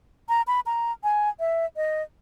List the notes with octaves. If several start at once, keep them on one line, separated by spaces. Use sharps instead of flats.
A#5
B5
A#5
G#5
E5
D#5